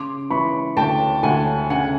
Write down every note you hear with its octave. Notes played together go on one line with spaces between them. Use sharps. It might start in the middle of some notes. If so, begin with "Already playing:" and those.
Already playing: C#3 C6 D6
E3 B5 C#6
D2 G5 A5
D2 F#5 G#5
C#3 F#5 G#5